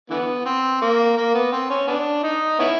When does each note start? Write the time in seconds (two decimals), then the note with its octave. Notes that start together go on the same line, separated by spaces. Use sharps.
0.10 D3 E3 B3
0.45 C4
0.82 A#3
1.17 A#3
1.34 B3
1.52 C4
1.70 C#4
1.87 B3 D4
2.23 D#4
2.59 B3 C#4 E4